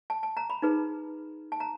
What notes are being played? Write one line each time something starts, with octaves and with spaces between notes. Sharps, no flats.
A5
A5
A#5
B5
D#4 G#4 B4
A5
A#5